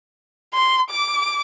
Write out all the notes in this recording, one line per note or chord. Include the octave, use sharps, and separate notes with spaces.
C6
D6